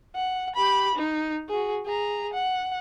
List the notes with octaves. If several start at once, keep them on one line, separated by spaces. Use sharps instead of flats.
F#5
G4 B5
D#4
F#4 G#4
G#4 A#5
F#5